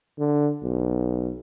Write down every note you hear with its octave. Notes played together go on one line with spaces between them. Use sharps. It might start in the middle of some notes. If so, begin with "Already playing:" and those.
D3
B1